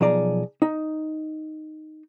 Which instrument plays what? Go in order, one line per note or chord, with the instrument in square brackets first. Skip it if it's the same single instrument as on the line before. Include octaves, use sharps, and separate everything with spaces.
[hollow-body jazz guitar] B1 F3 G#4 D5 A#5
D#4